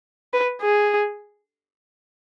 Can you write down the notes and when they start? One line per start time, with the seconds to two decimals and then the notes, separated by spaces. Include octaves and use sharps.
0.33 B4
0.62 G#4